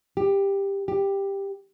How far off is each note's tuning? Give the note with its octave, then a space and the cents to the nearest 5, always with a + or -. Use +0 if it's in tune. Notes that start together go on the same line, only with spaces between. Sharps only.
G4 +10
G4 +10